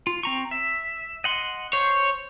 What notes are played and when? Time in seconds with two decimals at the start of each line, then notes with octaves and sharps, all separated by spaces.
0.07 F4
0.23 C4 A#5 C#6
0.51 E5
1.24 D#5 F#5 C6
1.73 C5 C#5